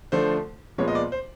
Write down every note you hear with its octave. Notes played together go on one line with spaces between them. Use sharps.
D3 F3 A3 C5
A#2 F3 G#3 B3 C#5
D#5
D5
C5